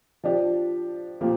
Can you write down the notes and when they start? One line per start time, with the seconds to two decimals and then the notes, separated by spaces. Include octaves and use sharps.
0.24 F3 D4 G4
1.21 A#2 F3 A#3 G4